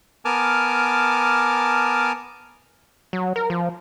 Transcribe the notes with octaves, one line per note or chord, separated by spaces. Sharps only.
B3 A#4 G#5 A5 D6 F6
F#3
A#4
F3